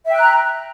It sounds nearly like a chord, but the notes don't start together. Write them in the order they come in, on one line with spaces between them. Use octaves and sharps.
E5 G5 F#6 A#5